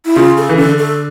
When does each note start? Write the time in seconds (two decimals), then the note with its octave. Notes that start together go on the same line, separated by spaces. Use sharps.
0.05 E4
0.16 C#3 F4
0.37 A4
0.49 E3
0.58 D3 A4
0.78 A4